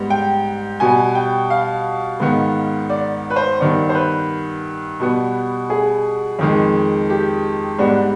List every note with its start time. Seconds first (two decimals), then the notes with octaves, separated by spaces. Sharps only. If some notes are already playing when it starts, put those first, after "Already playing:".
Already playing: G#2 G3 B3
0.10 G5
0.80 B2 G3 B3 G#5
1.15 G5
1.50 F5
2.20 G#2 D#3 B3
2.90 D5
3.30 B4
3.36 C5
3.60 G2 D#3 B3 D5
3.89 C5
3.95 B4
5.00 B2 G3 B3
5.70 G#4
6.39 F2 D#3 G#3
7.10 G4
7.79 G#2 G3 B3 D4